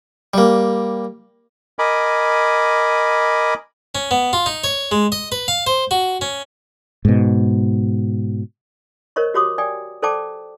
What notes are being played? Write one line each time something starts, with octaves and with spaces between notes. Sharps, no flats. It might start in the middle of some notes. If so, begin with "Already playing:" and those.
G3 A#3
A#4 D#5 G#5 B5 D6
C#4
B3
F4
D#4
C#5
G#3
D#5
B4
F5
C5
F#4
C#4
G#2 B2
A#4 C5 C#5 D#5 C#6
F#4 G4 C#5 C6 D6 D#6
D5 G5 G#5 D#6
A4 C5 D5 G5 A5 D6